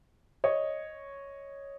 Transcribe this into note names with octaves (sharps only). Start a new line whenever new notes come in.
C#5 D#5